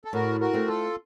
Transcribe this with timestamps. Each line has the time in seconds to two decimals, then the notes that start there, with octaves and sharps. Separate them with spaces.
0.05 A4
0.13 A2 F#4 A#4
0.40 F#4 A#4
0.53 A3 C4
0.67 F4 A4